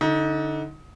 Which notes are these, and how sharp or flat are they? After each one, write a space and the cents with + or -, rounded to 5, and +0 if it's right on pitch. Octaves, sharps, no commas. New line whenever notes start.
D3 +0 D#4 +25